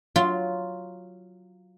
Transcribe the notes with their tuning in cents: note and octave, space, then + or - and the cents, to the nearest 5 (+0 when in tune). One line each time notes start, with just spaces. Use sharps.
F#3 +0 F4 +0